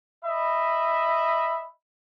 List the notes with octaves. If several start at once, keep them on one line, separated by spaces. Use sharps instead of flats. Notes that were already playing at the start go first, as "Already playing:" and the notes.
D#5 E5 B5